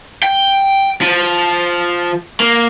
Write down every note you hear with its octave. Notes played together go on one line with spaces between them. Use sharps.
G5
F3
A#3